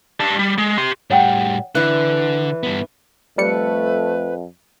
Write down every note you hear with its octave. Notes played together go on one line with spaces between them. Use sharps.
G3 A5
G3
G#3
G4 C6
A2 G3 C#5 F#5 G5
D3 E3 E4 F#6
G2 B3
F2 G3 A3 B4 C#7